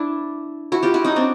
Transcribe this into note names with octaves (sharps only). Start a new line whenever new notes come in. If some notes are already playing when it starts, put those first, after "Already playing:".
Already playing: D4 E4
E4 F#4
F4 G4
E4 F#4
C#4 D#4
C4 D4